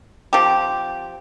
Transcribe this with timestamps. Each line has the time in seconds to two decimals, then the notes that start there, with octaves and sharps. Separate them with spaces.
0.33 F3 C4 G4